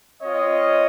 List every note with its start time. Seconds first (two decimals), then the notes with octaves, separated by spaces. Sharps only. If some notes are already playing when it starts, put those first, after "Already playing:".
0.23 C4 F4 C#5 D#5